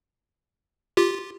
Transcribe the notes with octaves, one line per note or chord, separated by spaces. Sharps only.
F4 G4